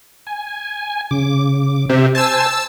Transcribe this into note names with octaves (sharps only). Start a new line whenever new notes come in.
G#5
C#3 D6
C3 G4 C5 E5
C5 G#5 A5 E6